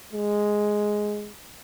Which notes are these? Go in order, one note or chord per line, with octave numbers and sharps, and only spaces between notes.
G#3